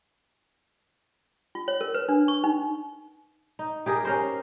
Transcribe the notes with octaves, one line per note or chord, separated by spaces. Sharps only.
F4
C#5
A#4
B4
D4
C#6
D#4
D#4
G4 G#4 A#4
C#4 A#4 C5